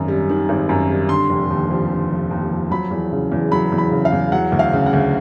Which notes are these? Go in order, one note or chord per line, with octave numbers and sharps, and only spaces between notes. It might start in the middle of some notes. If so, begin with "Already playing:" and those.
Already playing: G#1 F#2 D#3
G3
D#3
G#1
F#2
G3
D3 C6
F1
D#2
F3
D3
F1
D#2
F3
F#3 B5
E2
C#3
E2
F#3 B5
E2
B5
C#3
F5
E2
F#3 F#5
D2
F5
C#3
F#5
D2